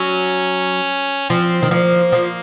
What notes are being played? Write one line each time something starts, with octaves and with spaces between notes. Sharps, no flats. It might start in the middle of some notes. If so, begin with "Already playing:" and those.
Already playing: F#3 C#4
F3 C4
D#3
F3 A#3
F3